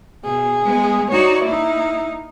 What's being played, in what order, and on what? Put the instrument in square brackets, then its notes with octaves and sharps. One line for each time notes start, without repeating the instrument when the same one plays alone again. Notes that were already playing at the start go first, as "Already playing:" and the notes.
[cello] B2 [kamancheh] G#4
[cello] G#3 B3
[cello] D#4 F#4 [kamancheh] C#5 D5
[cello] A#3 D#4 [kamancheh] E4